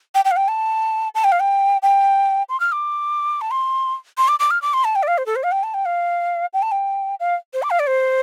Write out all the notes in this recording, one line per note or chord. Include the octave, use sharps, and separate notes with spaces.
G5
G5
F5
G5
A5
A5
G5
F5
G5
G5
C6
F6
D6
A5
C6
C6
D6
D6
F6
D6
C6
A5
G5
D5
F5
C5
A4
C5
F5
G5
A5
G5
F5
G5
A5
G5
F5
C5
D6
F5
D5
C5